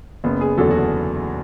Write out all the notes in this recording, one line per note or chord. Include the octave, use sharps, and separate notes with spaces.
F#1 B3
G#4
E2 D3 F#3 A4
F#4